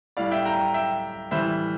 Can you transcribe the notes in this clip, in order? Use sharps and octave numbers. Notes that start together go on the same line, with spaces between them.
A2 G3 D5 F5
E5 G5
G5 A#5
E5 G5
A2 E3 G3 C5 E5